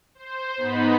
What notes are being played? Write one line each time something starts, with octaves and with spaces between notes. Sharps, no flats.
C5
G#2 B3 D#4 B5